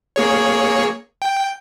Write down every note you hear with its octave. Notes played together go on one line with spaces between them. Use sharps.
A#3 G#4 C#5
G5